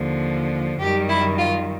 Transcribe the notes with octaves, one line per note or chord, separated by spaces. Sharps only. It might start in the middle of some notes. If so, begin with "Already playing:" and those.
Already playing: D#2 D3 F3
F#2 D#3 G3 G4
E4
F4